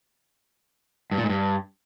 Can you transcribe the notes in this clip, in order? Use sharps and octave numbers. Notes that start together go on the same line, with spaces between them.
G2
A#2
G#2
G2